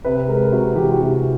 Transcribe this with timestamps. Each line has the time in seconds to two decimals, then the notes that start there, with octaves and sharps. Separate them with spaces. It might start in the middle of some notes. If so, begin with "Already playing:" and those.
0.04 C3 B4
0.28 G#3 A#4
0.37 B4
0.44 A#4
0.52 C3 F#4
0.75 E3 G4
0.91 F#4
0.99 C3 G4